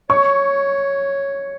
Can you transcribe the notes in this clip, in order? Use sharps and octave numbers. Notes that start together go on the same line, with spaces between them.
C#5 C#6